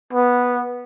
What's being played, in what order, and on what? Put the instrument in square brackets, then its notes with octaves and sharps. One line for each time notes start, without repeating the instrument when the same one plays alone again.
[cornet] B3